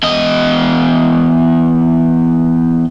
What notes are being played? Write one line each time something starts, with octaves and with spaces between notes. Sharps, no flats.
E2 D#5